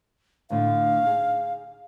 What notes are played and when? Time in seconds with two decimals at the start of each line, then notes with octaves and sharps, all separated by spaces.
0.50 D2 A2 D3 F5
1.03 D#4 G#4